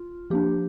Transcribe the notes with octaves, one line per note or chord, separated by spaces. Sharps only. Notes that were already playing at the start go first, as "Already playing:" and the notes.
Already playing: F4
F3 A#3 D4 G4